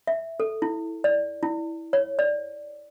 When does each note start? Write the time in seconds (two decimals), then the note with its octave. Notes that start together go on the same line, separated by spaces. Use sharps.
0.07 E5
0.40 A4
0.62 E4
1.04 D5
1.43 E4
1.93 C#5
2.19 D5